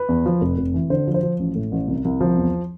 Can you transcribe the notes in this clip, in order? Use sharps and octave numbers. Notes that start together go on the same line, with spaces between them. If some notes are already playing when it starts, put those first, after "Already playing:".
Already playing: B4
E2
F3
F1
F1
E3
D3 C5
F3
C5
F3
A1
A2
A1
C2
C2
F3
E2